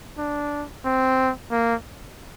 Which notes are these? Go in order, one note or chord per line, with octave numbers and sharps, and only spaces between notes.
D4
C4
A#3